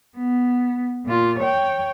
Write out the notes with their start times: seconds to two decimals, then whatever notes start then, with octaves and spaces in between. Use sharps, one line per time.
0.17 B3
1.06 A#2 F4
1.40 C#5 G5